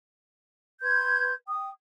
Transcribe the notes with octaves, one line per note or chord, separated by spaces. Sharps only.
B4 C6 G6 G#6
G5 D#6